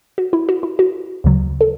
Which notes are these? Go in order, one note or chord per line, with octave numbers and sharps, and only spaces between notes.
F#4
E4
F#4
E4
F#4
D2 C#3 F#3
A4